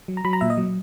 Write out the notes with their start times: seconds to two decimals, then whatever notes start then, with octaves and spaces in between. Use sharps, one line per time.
0.08 F#3
0.17 A#5
0.25 F#3 B5
0.33 A#5
0.41 A#2 E5
0.50 D#5
0.58 F#3